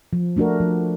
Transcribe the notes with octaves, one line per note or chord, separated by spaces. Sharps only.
F3
A3 D4 F#4 A#4
F3